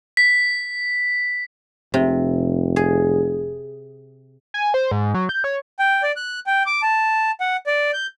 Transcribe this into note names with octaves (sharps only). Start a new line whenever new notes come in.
B6
F1 C3
G#4
G#5
C5
G#2
F#3
G6
C#5
G5
D5
F#6
G5
D6
A5
F#5
D5
G6